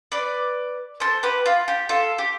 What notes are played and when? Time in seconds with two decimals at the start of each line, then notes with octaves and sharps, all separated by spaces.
0.12 B4 D5
1.00 A4 C5
1.23 G4 B4
1.46 F4
1.68 G4
1.89 F4 A4
2.18 G4